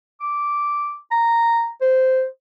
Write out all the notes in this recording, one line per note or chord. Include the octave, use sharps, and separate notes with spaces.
D6
A#5
C5